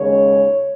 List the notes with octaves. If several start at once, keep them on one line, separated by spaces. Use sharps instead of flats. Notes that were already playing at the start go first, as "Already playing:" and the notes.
Already playing: D#2 C#3 G#3 C#5